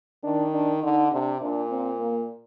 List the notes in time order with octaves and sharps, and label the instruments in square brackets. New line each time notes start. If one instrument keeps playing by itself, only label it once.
[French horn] D#3 [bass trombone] D4
[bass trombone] D4
[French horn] D3 [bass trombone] D#4
[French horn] C3 [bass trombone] D4
[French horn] A#2 [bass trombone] D4
[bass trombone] C4
A#3